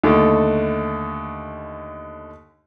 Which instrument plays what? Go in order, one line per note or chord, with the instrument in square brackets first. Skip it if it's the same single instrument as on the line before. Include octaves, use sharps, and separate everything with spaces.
[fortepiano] D#2 D3 A3